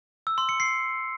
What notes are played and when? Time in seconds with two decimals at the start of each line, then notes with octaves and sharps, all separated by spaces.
0.27 E6
0.38 C6
0.49 C#7
0.60 C7